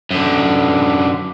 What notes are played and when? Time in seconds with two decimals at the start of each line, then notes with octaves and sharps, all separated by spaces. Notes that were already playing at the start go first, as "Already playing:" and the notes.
0.11 F#2 D3